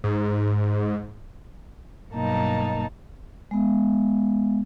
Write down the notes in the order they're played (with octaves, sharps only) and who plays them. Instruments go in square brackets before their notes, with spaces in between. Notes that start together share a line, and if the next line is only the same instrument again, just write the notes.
[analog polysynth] G#2
[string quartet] G2 B2 F#3 A#3 D#4 A5
[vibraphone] G#3 B3